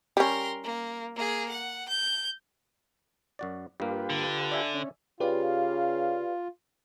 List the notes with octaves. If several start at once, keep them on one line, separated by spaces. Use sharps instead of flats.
G3 C#4 A#4 C6
A#3
A#3 G#4
F#5
G6
F#2 F#4 D5
G2 A#3 F4 G4 B4
D3
D5 E5 G#5
C#4
C#3 F4 G4 B4 D5 F5